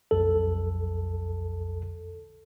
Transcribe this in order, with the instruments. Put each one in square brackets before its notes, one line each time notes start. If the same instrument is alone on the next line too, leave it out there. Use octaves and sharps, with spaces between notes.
[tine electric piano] B1 F2 A4